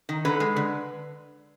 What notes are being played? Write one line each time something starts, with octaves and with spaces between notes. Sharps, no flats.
D#3
D3 B4
G#3
D3